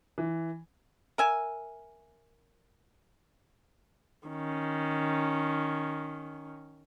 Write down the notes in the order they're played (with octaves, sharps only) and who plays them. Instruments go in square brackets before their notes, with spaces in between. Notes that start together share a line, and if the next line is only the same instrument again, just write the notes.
[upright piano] E3
[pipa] A#4 E5 G#5
[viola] D#3 C#4